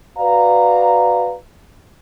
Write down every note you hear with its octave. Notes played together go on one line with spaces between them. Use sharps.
F#4 B4 D5 F5 A#5